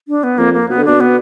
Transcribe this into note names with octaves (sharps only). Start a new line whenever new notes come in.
D4
B3
F2 A#3
A#3
B2 B3
D3
B2 D4
B3